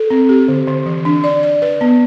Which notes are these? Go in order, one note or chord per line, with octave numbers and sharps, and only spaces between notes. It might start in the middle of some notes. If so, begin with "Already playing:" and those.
Already playing: A4
C4
G4
D3
D3
E3
D4
D5
D5
B4
B3